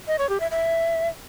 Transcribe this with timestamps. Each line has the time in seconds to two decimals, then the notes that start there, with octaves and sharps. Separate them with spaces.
0.08 D#5
0.19 C#5
0.29 G4
0.40 E5
0.51 E5